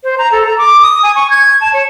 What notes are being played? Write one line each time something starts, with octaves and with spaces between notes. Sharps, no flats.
C5
A#5
A4
A#5
D6
D#6
G#5
C#6
G#6
A5
C#5